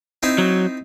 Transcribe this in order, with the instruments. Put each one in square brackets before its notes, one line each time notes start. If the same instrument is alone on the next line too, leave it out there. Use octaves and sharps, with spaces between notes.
[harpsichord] C4 D#4 E4
[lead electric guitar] F#3